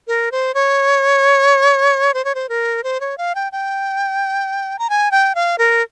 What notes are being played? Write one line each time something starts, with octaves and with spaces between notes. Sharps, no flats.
A#4
C5
C#5
C5
C#5
C5
A#4
C5
C#5
F5
G5
G5
A#5
G#5
G5
F5
A#4